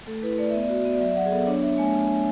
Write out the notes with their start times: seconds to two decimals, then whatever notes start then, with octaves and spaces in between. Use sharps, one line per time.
0.07 A3 A4
0.23 E4 B4
0.38 A3 D5
0.50 B3 E5
0.62 D5
0.69 F#4
0.85 B3
0.93 D5
1.00 F#3 E5
1.11 E5
1.16 F#3 F#5
1.25 G#4
1.32 B3 A4
1.47 D4 C#5
1.62 D4 E5
1.78 A3 G#5